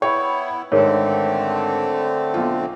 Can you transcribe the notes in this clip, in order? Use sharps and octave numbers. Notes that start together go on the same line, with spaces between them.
B3 E4 C#5 G5
G#2 D3 D#3 A3 C4 A#4 C#5
B1 F4